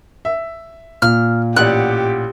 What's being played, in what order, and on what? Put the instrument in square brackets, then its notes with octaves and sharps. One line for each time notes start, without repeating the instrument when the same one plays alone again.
[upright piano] E5
[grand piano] A#2 [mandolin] F6
[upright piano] A1 D5 [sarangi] G4 [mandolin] F#5 F#6